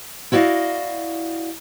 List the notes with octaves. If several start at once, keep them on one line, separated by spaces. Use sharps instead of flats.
E4 F#4 D5 D#5 F5